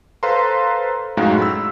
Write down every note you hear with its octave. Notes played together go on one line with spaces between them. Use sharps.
A4 B4 C5 F5 A#5 C6
F#2 A2 G#3 D#4 F#4 F5
B5 E6